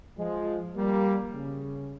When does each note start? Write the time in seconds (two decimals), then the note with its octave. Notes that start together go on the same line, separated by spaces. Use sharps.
0.17 F3 G#3
0.75 G3 A#3
1.33 C#3